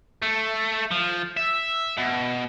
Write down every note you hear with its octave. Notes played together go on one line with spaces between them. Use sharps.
A3
F3
E5
B2